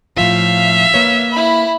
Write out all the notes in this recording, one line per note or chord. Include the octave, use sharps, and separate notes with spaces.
A2 F3 F4 E5 F5
A#3 B4 C#5
E4 B5